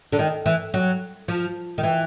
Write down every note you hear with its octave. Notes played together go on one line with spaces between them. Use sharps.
D3
D#3
E3
F#3
F3
D#3
E3